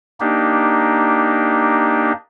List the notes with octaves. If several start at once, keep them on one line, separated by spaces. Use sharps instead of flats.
A#3 D4 D#4 G4